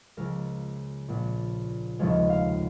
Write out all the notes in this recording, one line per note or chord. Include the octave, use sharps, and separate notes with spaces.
C#2 C#3 F3 A#4
A#1 A#2 A#3
F1 D#2 C#3 F3 G#3 C#5
F5